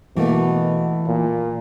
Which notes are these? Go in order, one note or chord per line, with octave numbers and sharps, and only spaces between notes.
B2 E3 A3 A#3
A#2